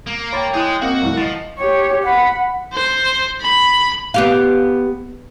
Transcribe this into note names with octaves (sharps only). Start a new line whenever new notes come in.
A#3
C#5 G5 B5 C6 A6
E4 G#4 D#5 D6 F#6 G6
A#3 C4 F#4 D#5 F5
C2 A2 E3
F3 D#5 A6
G4 C#5
F#5 B5
C5
B5
B3 G4 F5